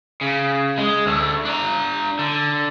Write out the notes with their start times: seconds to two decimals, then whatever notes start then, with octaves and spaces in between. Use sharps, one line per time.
0.21 C#3
0.78 G#3
1.06 D2 A3
1.45 D4 A#5
2.19 D3